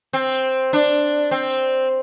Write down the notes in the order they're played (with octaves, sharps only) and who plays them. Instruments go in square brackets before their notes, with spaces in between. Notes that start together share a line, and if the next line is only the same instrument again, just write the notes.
[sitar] C4
D4
C4